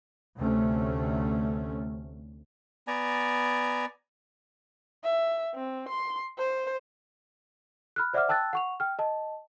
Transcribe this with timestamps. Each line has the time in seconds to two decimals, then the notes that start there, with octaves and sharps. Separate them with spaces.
0.39 D2 C3 A3 C#4
2.87 B3 D5 G#5 A#5
5.03 E5
5.55 C4
5.89 C6
6.38 C5
7.96 B5 F6 F#6
8.14 C5 D5 E5 F#5 D6 F6
8.29 G5 A5 E6 F#6 A6
8.53 F#5 C#6 F7
8.80 G5 F6
8.99 D#5 A5